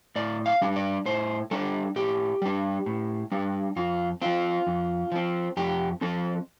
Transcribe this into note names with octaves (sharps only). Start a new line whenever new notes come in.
A2 D5
F5
G3 D4
D5
A2 C5
G3 D4 A4
A2 G4
G3 D4
A2
G3 D4
F2 F4
F3 C4 F4
F2
F3 C4
F2 G4
F3 C4 A4